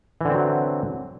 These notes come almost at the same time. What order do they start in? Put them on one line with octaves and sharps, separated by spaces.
E3 D3 C4 F#3